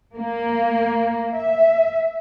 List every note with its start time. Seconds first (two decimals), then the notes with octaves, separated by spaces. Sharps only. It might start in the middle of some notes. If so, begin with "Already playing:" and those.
0.15 A#3
1.35 E5